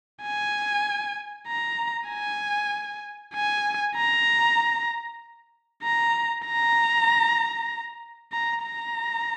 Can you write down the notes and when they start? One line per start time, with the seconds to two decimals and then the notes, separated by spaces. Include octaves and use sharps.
0.23 G#5
1.47 A#5
2.09 G#5
3.34 G#5
3.96 A#5
5.83 A#5
6.45 A#5
8.32 A#5
8.63 A#5